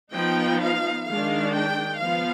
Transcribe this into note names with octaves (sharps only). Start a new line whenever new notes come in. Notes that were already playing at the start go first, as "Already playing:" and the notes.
F3 B3 D#4 G5
F5
D#3 G#3 D4 F5
G5
F3 B3 F5